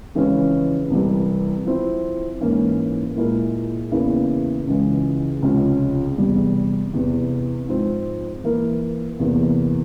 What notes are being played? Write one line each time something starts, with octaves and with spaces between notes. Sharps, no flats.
F2 C#3 E3 G#3 C#4
C2 C3 E3 G3
F3 C4 E4
G#2 E3 A#3 C#4
A#2 G#3 E4 A#4
E2 C#3 E3 A#3 E4
C#2 C#3 E3 G#3
C#2 C3 F3 G#3 C#4
E2 C3 G3
E2 C3 E3
G#2 F3 C4
E3 A#3 E4 A#4
E2 C3 E3 A#3